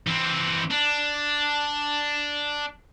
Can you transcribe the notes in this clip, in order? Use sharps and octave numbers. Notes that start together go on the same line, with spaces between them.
E3 C4
D4